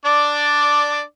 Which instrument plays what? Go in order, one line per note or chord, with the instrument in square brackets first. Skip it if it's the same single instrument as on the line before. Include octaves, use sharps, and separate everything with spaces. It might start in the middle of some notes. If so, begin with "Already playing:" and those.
[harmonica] D4 D5